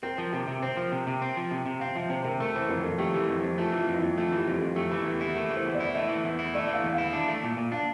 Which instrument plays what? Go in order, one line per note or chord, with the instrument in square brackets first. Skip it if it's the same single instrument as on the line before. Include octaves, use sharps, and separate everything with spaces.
[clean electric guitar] C4 [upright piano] A#4
[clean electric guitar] F3
[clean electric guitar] C3 [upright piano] A#4
[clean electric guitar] C3
[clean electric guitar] C4 [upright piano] C5
[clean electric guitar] F3
C3
C3
C4
F3
C3
C3
[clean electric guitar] C4 [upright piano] F5
[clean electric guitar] F3 [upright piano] E5
[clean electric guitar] C3 [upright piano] C5
[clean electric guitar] C3 [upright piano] A#4
[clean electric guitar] A3 [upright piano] A#4
[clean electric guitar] E3 [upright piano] C5
[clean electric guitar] F2 [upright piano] A#4
[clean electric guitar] F2 [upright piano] A4
[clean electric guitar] A3 [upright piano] G4
[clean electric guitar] E3
F2
F2
[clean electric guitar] A3 [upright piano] F4
[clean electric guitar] E3
[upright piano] F4
[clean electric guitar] F2
[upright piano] E4
[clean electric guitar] F2
[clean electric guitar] A3 [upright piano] F4
[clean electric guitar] E3 [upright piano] G4
[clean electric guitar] F2
[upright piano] A4
[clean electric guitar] F2
[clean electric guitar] A3 [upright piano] G4
[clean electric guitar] E3 [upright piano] A4
[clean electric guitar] E2 [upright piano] G4
[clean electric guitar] E4 [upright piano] A4
[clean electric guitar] A3 [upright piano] A#4
[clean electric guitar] E3
[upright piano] C5
[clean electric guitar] E2
[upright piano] D5
[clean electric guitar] E4
[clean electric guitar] A3 [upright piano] E5
[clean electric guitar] E3
E2
E4
[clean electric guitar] A3 [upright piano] D5
[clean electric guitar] E3
[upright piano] F5
[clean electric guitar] E2
[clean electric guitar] E4 [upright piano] F5
[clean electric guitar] D4
A3
A#2
A#2
[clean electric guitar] D4 [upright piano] F5